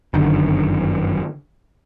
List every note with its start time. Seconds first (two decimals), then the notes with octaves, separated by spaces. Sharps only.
0.14 G1 F#2 D3 D#3